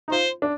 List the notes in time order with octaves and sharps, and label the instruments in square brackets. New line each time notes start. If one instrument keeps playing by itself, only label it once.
[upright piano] D#4
[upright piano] F4 [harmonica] C5
[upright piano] D4